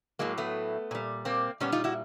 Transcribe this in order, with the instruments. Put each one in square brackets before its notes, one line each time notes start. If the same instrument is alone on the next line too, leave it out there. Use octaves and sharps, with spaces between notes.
[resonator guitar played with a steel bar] A2 F#3 G#3 A#3
A3 B3
A#2 G3
A#3 C4
A#2 G3 B3 C#4
D#4 F4
E4 F#4